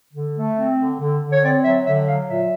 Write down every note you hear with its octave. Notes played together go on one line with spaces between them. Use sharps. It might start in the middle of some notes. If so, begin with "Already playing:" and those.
D3
A3
C4
D3
D3
D3
C#5
C4 D5
F#3 E5
D3 E5
F#3 F5
A#2 E5